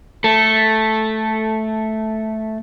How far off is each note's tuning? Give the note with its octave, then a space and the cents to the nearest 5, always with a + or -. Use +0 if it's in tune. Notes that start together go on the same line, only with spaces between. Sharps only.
A3 -5 A4 +0